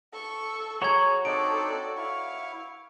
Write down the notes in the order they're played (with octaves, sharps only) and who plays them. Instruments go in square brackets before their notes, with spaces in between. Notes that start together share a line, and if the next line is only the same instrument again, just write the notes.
[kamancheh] A4 C#6
[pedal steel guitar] F#4 C#5 A#5 [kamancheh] G#4 [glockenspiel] C#6 G#6
[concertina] C4 D4 D#4 [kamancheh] A4 D5 [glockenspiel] D7
[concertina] E4 C#6 [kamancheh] F5